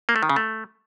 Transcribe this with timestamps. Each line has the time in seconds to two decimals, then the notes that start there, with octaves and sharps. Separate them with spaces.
0.09 A#3
0.16 A3
0.23 D#3
0.29 C#3
0.36 A3